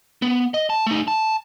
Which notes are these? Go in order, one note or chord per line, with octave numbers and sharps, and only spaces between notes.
B3
D#5
A5
A3 D#4
A5